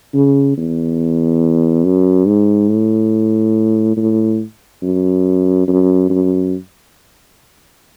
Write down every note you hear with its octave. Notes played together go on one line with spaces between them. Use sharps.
C#3
E2
F#2
G#2
A2
A2
F#2
F#2
F#2